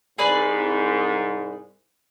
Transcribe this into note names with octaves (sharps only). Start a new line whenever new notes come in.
C2 G#2 G#4 B4 D5